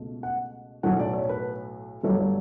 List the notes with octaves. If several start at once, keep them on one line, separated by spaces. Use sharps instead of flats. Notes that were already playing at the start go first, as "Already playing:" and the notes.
Already playing: C#2 B2 A3
F#5
B1 A2 F#3 A3 F#5
D5
C#5
B4
G1 G2 F#3 A3 C#5
D5